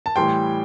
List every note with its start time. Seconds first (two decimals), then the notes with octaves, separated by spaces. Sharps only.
0.06 A5
0.16 A2 E3 G3 G5 C6